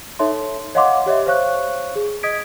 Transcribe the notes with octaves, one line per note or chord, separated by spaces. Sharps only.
D#4 A4 C#5 E5 C6
C#5 D#5 F5 F#5 C6 D6
G4 C#5 D#5 E5
C5 C#5 F5 C#6 F#6
G#4
D#5 D#6 G#6 B6 D7